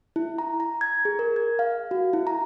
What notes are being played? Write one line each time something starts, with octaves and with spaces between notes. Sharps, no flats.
E4
A#5
A#5
G#6
G#4
A#4
G#6
F5
F#4
E4
A#5